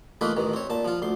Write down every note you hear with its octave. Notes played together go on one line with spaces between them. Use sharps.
E3 A3 A#3 D#4 F4 B4
A1 D#3 E3
C4 C#5
A#2 A5
F3 F4
D2 C6